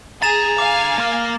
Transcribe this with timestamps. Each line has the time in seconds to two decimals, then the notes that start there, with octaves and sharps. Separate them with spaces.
0.22 D3 G#4 A#5 A6 E7
0.58 F5 G#5 D6
0.98 A#3 A#4